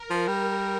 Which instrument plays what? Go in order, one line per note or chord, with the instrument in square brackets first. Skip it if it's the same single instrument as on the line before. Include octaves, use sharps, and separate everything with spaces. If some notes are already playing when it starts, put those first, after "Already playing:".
Already playing: [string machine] A#4
[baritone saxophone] F3
G3